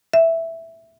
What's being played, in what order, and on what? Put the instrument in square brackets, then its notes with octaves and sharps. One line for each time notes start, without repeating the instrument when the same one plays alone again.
[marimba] E5